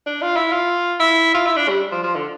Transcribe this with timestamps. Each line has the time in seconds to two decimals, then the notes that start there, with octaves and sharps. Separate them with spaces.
0.06 D4
0.22 F4
0.37 E4
0.52 F4
1.00 E4
1.34 F4
1.46 E4
1.57 D4
1.69 G3
1.92 F3
2.03 F3
2.15 D3